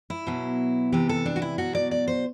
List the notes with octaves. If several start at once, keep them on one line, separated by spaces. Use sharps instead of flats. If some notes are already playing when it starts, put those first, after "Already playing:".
E4
B2 F#3
C3 E3 G4
A4
D4
F#4
E4
B2 F#3 F#4
D5
D5
C5